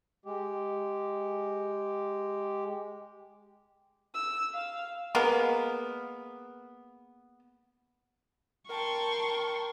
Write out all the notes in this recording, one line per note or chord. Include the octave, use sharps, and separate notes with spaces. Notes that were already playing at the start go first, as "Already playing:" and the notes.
G#3 G4
E6
F5
G#3 A#3 B3
A#4 G5 A5 C6 C#6